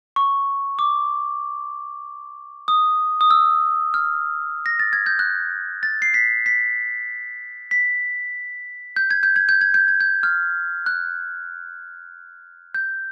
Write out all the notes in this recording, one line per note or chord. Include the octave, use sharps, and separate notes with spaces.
C#6
D6
D#6
D#6
E6
F6
A#6
A6
G#6
G6
F#6
A6
C7
B6
B6
B6
G6
G#6
G6
G#6
G6
G#6
G6
G#6
G6
F6
F#6
G6